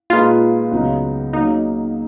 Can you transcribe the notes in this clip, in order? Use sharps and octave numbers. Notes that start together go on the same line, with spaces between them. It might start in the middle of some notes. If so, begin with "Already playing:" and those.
A#2 G#3 D#4 F4 G#4 B4
C#2 C#3 F#3 B3 D#4
C#3 F#3 A#3 D#4